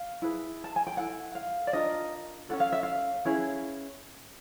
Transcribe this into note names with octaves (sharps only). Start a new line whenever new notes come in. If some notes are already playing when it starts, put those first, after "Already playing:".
Already playing: F5
E4 G#4 B4
A5
G#5
G5
E4 A4 F#5
F5
D5
D4 F4 A#4 D#5
C#4 F4 A4 F#5
F5
E5
F5
C#4 E4 G#4 B4